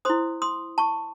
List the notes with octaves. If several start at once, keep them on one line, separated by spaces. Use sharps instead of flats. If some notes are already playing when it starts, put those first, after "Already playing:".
E4 C5 C6 D#6
C6 D#6
A5 C#6